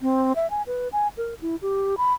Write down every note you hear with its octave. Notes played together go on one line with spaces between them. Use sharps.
C4
E5
G#5
B4
G#5
A#4
E4
G4
B5